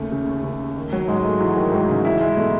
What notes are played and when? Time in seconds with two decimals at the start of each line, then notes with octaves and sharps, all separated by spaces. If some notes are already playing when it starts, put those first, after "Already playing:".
Already playing: D#2 C#3 A3
0.12 C#3
0.44 C#3
0.76 D#3
0.93 F#3
1.08 G#2 G#3
1.24 A3
1.40 E3 F#3
1.57 D#3
1.72 G#2 D#3
1.89 C#3
2.05 E3 E4
2.21 G#3
2.37 B2 A3